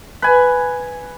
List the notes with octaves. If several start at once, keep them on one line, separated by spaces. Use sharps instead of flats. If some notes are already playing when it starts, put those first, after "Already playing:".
B4 G#5